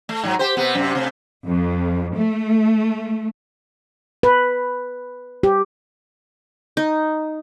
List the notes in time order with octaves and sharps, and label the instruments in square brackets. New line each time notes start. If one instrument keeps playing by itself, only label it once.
[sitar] A3
G#2 F#3
G4 C5
C3 B3
F#2 C3
C3 A3
[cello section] F2
A3
[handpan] B4
G4
[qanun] D#4